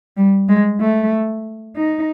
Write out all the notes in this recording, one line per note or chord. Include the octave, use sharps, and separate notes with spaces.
G3
G#3
A3
D#4